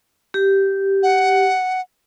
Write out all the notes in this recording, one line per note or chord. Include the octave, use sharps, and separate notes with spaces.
G4
F#5